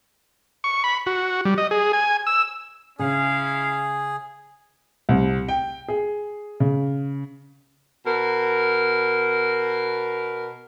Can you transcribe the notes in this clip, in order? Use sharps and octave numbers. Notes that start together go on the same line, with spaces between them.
C#6
B5
F#4
G3
D#5
G#4
G#5
E6
C#3 C#4 E4 G#4 F5
C2
G5
G#4
C#3
B2 A#4